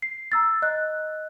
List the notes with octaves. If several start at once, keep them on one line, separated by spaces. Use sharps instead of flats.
C7
A#5 E6 A6
D#5 F#6